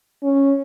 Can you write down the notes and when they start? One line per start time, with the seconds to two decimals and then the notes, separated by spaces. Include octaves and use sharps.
0.23 C#4